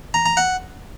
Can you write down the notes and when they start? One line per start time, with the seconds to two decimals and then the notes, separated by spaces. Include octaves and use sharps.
0.14 A#5
0.26 A#5
0.37 F#5